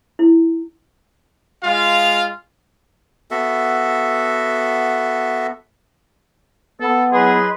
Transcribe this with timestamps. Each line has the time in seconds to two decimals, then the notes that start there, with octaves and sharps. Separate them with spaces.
0.19 E4
1.64 G#3 F4 F5
3.31 B3 F#4 A4 E5
6.81 B3 A4
7.11 F#3 E4 G#4 B4 D#5 C6